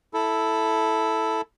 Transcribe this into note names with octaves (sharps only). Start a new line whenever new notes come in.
E4 A4